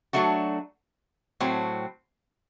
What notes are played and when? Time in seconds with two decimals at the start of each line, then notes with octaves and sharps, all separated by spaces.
0.13 F#3 A3 D4 F#4
1.40 A2 F#3 C4